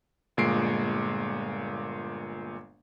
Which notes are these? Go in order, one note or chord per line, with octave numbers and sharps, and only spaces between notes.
G1 A#2 G#3 C7 D7